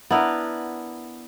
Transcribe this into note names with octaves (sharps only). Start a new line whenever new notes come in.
B3 D4 E4 A#4